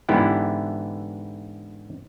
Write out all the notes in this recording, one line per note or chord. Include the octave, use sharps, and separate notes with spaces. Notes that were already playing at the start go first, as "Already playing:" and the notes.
G#2 D3 E3 B3 E4 G4